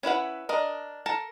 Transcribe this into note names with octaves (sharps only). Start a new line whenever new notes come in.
C#4 E4 B4 F#5
D4 A#4 D#5
A4 A#4 A5